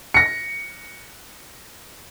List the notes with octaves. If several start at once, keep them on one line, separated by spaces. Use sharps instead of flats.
A#6 C#7